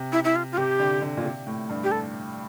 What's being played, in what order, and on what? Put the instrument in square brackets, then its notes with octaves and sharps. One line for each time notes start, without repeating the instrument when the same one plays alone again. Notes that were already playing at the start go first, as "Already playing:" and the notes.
Already playing: [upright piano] C3
[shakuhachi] E4
E4
F4
F4
[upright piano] C3 [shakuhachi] G4
[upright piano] D3
D3
A#2
C3
A2
G2
[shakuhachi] G4
A4